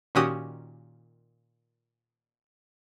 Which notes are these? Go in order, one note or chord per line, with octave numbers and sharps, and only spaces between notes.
A#2 D#3 C#4 F#4 G4 D#6